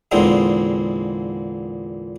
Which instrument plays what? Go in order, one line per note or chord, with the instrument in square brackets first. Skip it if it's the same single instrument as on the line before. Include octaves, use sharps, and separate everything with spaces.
[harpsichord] E2 A#2 D3 G#3 C4 D#4